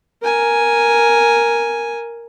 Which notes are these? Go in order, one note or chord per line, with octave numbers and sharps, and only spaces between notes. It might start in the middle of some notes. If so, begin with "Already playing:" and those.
A#4 G#5